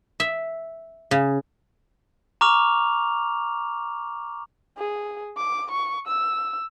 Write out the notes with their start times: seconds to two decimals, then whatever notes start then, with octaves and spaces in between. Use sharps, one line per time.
0.20 E5
1.11 C#3
2.41 A#5 C#6 D6 F6 F7
4.77 G#4
5.37 D6
5.71 C#6
6.07 E6